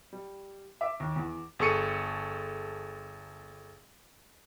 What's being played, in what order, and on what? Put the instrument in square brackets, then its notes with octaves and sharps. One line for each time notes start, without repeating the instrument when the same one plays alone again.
[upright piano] G3
E5 D6
D#2
E2
[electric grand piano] G1 G#4 A4 C#6 C#7 D#7